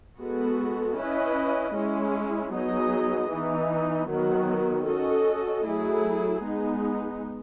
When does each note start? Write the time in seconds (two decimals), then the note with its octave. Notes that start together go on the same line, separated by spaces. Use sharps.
0.18 G#3 B3 F#4 A4
0.97 C#4 E4 B4 D#5
1.74 G#3 C#4 E4
2.52 F#3 B3 D#4 G#4 D#5
3.31 E3 B3 D#4
4.09 D#3 F#3 B3 F#4
4.87 C#4 F#4 A4 D#5
5.65 F#3 A3 E4 G#4
6.43 G#3 B3 D#4